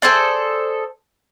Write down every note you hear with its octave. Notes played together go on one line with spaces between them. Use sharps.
G#4 A4 C5 D5